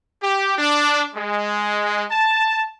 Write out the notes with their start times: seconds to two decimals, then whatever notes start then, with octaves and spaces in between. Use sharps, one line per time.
0.23 G4
0.58 D4
1.15 G#3
2.11 A5